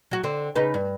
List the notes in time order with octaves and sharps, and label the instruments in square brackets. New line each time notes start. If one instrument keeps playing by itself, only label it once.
[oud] F#3 F#4
D3 C4
C#3 D#4 B4
G2